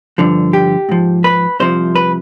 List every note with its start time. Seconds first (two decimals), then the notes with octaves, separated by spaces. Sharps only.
0.18 G2 D3 F3
0.53 G4
0.89 G#2 F3
1.24 B4
1.60 C2 C3 F3 C5
1.96 B4